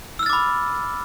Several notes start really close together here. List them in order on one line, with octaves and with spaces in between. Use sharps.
E6 F6 A6 D6 B5